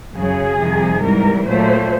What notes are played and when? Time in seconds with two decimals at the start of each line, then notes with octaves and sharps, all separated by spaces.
0.15 F#2 C#3 F#3 G#4
0.58 F2 C3 D#3 G3
1.02 G#2 E3 G3 A#4
1.45 A#2 F#3 A3 C5